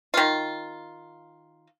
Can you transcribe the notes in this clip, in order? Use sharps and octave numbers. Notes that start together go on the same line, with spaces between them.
D#3 F4